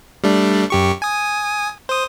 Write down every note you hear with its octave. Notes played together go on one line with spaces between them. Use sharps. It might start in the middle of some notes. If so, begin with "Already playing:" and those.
G3 A3 D4
F#2 G4 C#6
G#5 D#6
C5 D#6